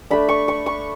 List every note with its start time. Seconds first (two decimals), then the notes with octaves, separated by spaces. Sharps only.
0.11 A3 D4 B5
0.29 C#6
0.48 C#6
0.66 C#6